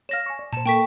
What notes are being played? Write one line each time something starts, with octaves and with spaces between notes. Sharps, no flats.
C#5 F5 F6 A#6 E7
G#5 C#6
D5
A#2 C5 A5 E7
A#3 A4 G5 C#6 B6